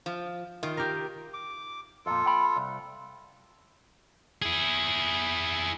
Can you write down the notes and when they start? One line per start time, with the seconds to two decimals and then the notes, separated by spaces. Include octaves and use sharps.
0.06 F3
0.63 D#3 F4
0.77 G4 A#4
1.34 D6
2.06 F2 A#2 F4 A4
2.26 G5 B5
2.57 C2
4.42 E4 G#4